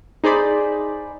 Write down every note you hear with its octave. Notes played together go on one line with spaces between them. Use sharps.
D#4 G#4 C5 D5 B5